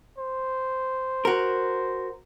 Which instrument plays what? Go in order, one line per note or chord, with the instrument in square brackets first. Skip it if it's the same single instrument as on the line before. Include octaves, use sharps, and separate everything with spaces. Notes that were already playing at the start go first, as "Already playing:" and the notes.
[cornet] C5
[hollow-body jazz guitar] F#4 A#4